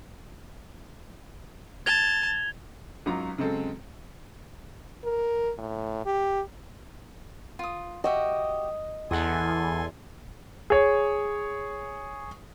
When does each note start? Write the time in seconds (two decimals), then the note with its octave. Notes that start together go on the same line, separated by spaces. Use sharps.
1.86 A5 G#6 F7 G7
3.06 G#1 F#3 C#4 F4 A#5
3.38 C#3 F#3 G#3 C4 A4
5.04 A#4
5.58 A2
6.06 G4
7.59 F4 D#6
8.04 F#4 G4 D#5 E5
9.11 E2 A4 F#5 G#5 C6 D#6
10.70 G#4 C#5